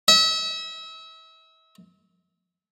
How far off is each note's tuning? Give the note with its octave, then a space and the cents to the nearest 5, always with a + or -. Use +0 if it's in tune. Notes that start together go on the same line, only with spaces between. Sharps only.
E5 -35